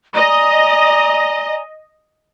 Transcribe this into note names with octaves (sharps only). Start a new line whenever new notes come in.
D5 D#5 G#5 A#5